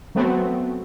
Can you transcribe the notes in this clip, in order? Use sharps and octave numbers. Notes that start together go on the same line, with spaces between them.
F#3 A3 B3 C4 F#4